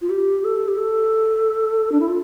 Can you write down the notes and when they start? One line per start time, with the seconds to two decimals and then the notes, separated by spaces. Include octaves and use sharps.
0.01 F4
0.09 G4
0.44 A4
0.68 G4
0.78 A4
1.91 D4
2.00 E4
2.08 F4